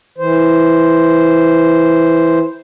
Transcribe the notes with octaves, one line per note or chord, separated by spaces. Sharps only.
E3 C5